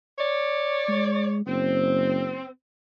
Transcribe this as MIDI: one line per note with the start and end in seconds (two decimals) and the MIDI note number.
0.19 1.33 73
0.19 1.33 74
0.88 1.43 56
1.46 2.40 30
1.46 2.47 60